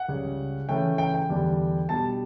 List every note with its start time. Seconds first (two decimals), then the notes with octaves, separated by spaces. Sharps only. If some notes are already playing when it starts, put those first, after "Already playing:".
Already playing: F#5
0.08 C#2 C#3 G3
0.68 C#3 E3 A3 C#4 G5
0.98 G5
1.14 G5
1.29 E2 D3 G3
1.89 B2 G3 D4 A5